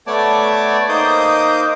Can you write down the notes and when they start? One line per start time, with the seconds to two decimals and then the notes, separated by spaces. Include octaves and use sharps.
0.07 A3 B3 C#5 D5 A5 D6
0.89 A#3 D#4 C5 D6 D#6 G6